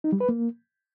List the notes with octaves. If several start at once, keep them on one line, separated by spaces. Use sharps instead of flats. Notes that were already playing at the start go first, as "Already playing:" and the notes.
D#4
G3
B4
A#3